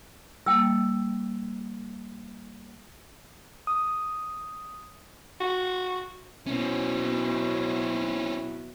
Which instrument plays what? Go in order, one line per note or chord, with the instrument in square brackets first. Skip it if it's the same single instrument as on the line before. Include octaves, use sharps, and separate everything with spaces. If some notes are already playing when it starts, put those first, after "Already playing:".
[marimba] G3 A#3 [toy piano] G5 E6
[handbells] D#6
[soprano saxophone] F#4
[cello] B2 F#3 [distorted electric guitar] C4 C#4 [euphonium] E4